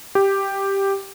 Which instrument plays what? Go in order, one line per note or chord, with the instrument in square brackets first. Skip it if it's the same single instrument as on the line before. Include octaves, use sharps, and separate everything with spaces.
[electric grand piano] G4